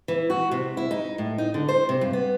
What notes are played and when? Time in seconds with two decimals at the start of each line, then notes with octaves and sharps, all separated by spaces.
0.08 E3
0.30 F#4
0.51 C3
0.77 E4
0.91 D#4
1.18 A2
1.38 D#4
1.54 D3
1.69 C5
1.89 C3
2.01 G2
2.13 B3